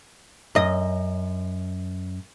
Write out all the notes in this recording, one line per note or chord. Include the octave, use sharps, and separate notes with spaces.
F#2 D#5